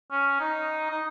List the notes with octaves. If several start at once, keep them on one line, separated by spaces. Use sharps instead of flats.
C#4
D#4
D#4